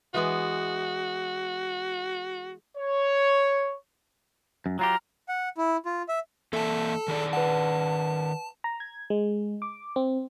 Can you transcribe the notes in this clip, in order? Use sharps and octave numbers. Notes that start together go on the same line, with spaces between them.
E3 G#3 B3 F#4
C#5
F#2
F#3 F4 G4 A#5 F6
F#5
E4
F4
E5
E3 A#3 A4 E5 A5
D#3 G#4 D5
B4 F#5 A5
A#5
G#6
G#3
D6
C4